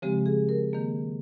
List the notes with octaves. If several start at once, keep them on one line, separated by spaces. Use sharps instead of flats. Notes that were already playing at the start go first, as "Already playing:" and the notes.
C#3 F3 G#3 C4 G4
G#4
A#4
D#3 A#3